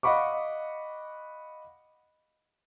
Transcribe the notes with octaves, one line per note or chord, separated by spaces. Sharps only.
D#5 F5 F#5 B5 C#6 D6